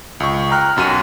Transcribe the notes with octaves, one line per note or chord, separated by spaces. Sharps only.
C#2 C#6
G5 A#5 F6 F#6
B1 F#2 F#4 D#7